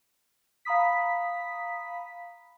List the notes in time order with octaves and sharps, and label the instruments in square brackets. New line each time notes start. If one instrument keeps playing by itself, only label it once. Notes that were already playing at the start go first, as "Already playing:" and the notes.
[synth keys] F5 A#5 B5 D#6 B6